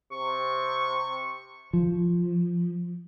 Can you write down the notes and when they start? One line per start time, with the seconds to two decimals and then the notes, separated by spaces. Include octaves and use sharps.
0.12 C3 C#6
1.73 F3